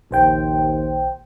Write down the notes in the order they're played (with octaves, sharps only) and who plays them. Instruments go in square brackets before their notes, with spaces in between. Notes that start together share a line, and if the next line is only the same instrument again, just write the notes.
[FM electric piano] A#1 C5 G5 [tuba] D#2